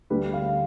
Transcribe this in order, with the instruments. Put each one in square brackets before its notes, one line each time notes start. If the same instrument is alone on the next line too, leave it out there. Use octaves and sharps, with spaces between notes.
[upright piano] D2 D3 G3 B4
F5